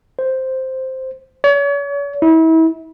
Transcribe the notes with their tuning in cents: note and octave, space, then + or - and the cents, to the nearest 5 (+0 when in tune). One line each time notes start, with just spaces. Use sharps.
C5 +0
C#5 +40
E4 -35